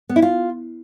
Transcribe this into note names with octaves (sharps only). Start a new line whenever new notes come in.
B3
E4
F4